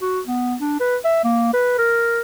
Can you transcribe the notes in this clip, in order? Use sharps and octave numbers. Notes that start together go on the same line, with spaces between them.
F#4
B3
D4
B4
E5
A#3
B4
A#4